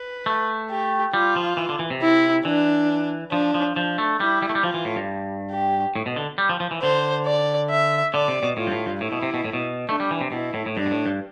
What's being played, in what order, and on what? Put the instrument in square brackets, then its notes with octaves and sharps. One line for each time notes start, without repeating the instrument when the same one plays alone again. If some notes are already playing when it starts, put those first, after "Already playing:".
Already playing: [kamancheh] B4
[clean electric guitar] A3
[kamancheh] G4
[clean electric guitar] G3 [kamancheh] F4
[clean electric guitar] F3
E3
D3
E3
C3
[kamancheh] E4
[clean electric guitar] E3 [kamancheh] D4
[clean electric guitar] F3 [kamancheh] D4
[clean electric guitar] F3
[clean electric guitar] F3 [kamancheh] D4
[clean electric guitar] A3
[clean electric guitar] G3 [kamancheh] E4
[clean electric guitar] G3
A3
G3
[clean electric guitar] F3 [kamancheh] F4
[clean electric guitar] E3
A2
G2
[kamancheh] G4
[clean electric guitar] A2
B2
D3
G3
F3
F3
E3
[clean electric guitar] D3 [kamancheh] C5
[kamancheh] D5
E5
[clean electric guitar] D3 [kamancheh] D5
[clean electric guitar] C3
B2
[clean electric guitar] A2 [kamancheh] F4
[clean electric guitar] G2
A2
G2
[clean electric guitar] A2 [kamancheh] E4
[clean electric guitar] B2
C3
B2
A2
B2
[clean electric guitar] A3 [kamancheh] D4
[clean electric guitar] G3
E3
C3
[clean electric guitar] B2 [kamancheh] E4
[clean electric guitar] A2
A2
[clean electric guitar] G2 [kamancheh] D4
[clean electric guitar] B2
A2
G2